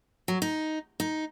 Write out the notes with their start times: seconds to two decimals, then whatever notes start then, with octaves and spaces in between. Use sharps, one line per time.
0.28 F#3
0.42 D#4
1.00 D#4